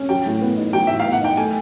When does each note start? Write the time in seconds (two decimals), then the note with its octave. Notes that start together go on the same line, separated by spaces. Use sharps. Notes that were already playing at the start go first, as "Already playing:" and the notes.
Already playing: C#4
0.09 F#3 G5
0.26 A2
0.41 B3
0.57 D#4
0.73 F#3 G5
0.87 A2 E5
1.00 F5
1.05 B3
1.12 F#5
1.21 D#4 G5
1.37 A3 G#5